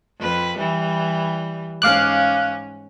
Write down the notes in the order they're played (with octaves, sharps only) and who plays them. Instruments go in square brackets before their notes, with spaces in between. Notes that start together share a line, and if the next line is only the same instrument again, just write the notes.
[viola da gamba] F2 B4
E3 G3
[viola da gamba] G#2 C#4 [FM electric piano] F5 D6 F#6